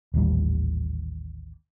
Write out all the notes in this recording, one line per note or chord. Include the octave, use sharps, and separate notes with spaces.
D#1 A1 D#2 G3